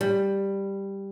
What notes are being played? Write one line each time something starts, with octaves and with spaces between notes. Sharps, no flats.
G3